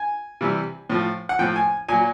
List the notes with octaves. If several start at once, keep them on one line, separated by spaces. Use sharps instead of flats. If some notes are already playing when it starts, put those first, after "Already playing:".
Already playing: G#5
C3 E3 G3
A2 F3
F#5
A2 F3 G5
G#5
A#2 F#3 G#5